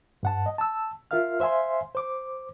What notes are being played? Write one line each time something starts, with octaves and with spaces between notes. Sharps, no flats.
G2 F#5 A5
D#5
A5 E6
F4 A#4 E5 F5 F6
C5 E5 F5 G#5 C6
C5 D6